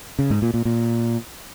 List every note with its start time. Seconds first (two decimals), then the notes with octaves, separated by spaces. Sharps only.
0.19 C#3
0.30 G#2
0.42 A#2
0.54 A#2
0.65 A#2